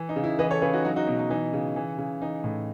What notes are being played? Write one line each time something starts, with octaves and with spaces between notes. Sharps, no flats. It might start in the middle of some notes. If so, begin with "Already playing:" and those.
Already playing: E3
D#4
C#3
E4
E3 B4 D#5
A4 C#5
C#3 G#4 B4
D#4 F#4
F#3 D#4 F#4
D#4 F#4
B2
D#4
E3 D#4
C#3
E3
C#3
E3 D#4
A2